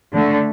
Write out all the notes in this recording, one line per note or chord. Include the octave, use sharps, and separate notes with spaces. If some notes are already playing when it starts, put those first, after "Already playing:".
D3 A3